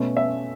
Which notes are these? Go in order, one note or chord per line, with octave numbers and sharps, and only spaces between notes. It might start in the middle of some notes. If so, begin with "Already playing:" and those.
Already playing: B2 A3 C#4
E5